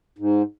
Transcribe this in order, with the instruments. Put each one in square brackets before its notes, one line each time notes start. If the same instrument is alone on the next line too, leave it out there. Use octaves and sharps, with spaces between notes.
[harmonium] G#2